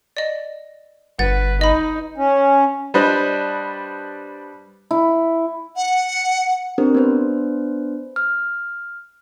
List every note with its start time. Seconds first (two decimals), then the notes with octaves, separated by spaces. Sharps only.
0.17 D5 D#5
1.19 G1 B4 F#5 A6
1.61 D#4 D#5 B5
2.17 C#4
2.94 G3 D4 B4 C5 D#5
4.91 E4
5.76 F#5
6.78 C4 D4 G4 A#4 C5
6.95 B3 D4 B4 C5
8.16 F6